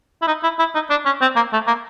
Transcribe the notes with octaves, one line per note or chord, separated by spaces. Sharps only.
E4
D#4
E4
E4
D#4
D4
C#4
C4
A#3
A3
A#3